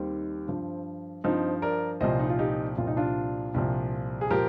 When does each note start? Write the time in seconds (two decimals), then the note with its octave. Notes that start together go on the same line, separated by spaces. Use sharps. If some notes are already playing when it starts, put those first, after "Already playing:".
Already playing: D#2 D#3 G3 C4
0.47 G2 F3
1.24 G2 F3 C4 D#4
1.62 A#4 D5
2.00 C2 A#2 F3 C5 D#5
2.19 D#4
2.29 F4
2.39 D#4 G4
2.77 C2 A#2 F3 F4
2.87 D#4
2.97 D4 F4
3.54 C2 A#2 F3
4.21 G#4
4.31 A#2 F3 G4 A#4